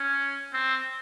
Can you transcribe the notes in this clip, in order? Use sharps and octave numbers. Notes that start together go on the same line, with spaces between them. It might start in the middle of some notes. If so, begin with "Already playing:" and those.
Already playing: C#4
C4